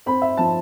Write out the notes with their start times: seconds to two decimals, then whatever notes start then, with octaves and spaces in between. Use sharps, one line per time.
0.06 C4 B5
0.22 E5
0.38 F3 A5